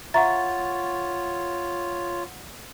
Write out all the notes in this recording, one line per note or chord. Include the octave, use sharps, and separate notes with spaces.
F4 C#5 E5 F#5 A#5 C#6 A6